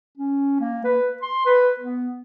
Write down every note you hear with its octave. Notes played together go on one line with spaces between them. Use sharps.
C#4
A#3
B4
C6
B4
B3